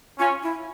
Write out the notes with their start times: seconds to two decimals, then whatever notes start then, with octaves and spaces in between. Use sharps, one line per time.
0.19 C#4 F4
0.43 E4